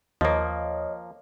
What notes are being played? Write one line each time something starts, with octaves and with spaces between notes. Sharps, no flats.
D#2 F3 A#3 C#5 D#5